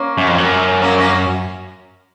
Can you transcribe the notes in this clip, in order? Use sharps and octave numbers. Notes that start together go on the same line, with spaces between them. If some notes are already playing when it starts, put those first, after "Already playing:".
Already playing: A#3 C#4
F#2
F2
F#2
A#3 C#4
A#3 C#4